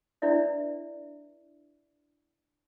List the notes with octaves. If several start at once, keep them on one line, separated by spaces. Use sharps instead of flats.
D4 E4 B4 D5 E5